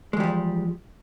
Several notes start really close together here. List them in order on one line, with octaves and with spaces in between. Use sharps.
G#3 E2 G3 F3